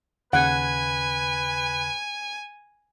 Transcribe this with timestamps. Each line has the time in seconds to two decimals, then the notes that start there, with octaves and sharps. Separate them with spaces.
0.33 D#2 C#3 B4 F#5 G#5 G#6